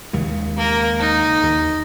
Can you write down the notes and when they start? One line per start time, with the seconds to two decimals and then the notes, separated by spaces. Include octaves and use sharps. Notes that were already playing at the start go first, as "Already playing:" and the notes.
0.13 D#2 C#3 G#3
0.57 A#3 A#4
0.99 D#4
1.43 D#2